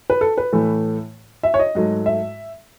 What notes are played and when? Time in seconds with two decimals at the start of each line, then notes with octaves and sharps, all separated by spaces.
0.10 B4
0.21 A4
0.38 B4
0.53 A2 E3 A3
1.43 E5
1.54 C#5
1.59 D#5
1.75 G#2 F#3 A3
2.06 E5